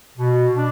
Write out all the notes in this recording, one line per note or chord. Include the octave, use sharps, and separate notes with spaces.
B2
D4